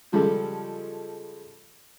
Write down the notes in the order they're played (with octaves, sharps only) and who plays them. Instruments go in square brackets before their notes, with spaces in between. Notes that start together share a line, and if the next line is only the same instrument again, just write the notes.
[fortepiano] C#3 F3 G3 G#3 G4 A4